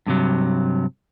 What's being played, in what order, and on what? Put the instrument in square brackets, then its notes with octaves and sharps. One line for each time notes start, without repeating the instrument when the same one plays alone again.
[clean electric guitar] G2 C3 F#3